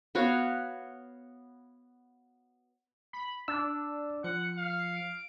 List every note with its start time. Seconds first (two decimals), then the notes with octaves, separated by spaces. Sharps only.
0.15 B3 F#4 C#5 F5
3.13 B5
3.48 D4 E6
4.24 F3 F#5 C#7
4.58 F5
4.97 D7